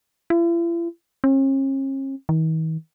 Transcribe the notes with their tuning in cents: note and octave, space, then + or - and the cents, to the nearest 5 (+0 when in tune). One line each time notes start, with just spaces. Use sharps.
E4 +45
C#4 -45
D#3 +45